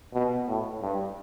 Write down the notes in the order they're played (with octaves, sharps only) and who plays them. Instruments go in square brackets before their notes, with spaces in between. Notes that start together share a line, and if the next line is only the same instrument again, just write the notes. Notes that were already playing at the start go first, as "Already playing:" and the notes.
[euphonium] B2
A2
G2